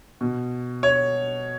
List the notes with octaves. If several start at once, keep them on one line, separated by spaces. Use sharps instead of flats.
B2
C#5